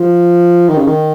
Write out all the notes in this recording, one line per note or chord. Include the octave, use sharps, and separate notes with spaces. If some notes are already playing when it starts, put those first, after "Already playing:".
Already playing: F3
D#3
C#3
D#3